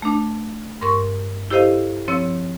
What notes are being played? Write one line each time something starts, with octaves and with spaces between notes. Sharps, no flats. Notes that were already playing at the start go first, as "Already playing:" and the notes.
A3 D4
G2 A#4 C6 C#6
E4 G4 A4 C5 D#5 F5
F3 C4 C#5 E6